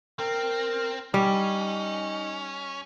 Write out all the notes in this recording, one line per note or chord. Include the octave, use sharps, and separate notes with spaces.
C4 A#4
G3 C#4 D#4